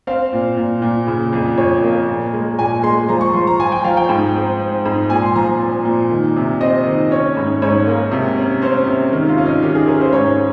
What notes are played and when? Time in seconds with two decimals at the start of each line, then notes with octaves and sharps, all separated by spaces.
0.07 C4 F5
0.33 A#2
0.57 A#2
0.82 A#2
1.07 C#3
1.33 F2
1.57 F2 C#5
1.83 A#3
2.09 A#2
2.33 G#3
2.59 A#2 G#5
2.83 G#3 C6
3.09 F3 A#5
3.21 C#6
3.33 F3 C6
3.47 A#5
3.60 F3 G#5
3.72 G5
3.84 F3 F5
3.97 G5
4.09 G#2
4.34 C4
4.60 C4
4.86 G#2
5.10 A#2 G#5
5.22 C6
5.36 F3 A#5
5.48 A#5
5.60 C4
5.85 A#2
6.11 D#3
6.36 C3
6.61 C4 D#5
6.87 D#3
7.11 C#4 C#5
7.37 G#2
7.62 G#2 C#5
7.87 A#3
8.12 C3
8.37 C#4
8.62 C#4 C5
8.87 C3
9.12 D#3 A#4
9.29 F4
9.38 C#4
9.46 D#4
9.63 D#3 G4
9.75 G#4
9.87 C#4 A#4
10.01 C5
10.13 G#2 C#5